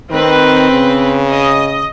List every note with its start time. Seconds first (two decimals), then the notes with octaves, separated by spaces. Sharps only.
0.11 D#3 C4 B4
0.72 C#3
1.29 D#5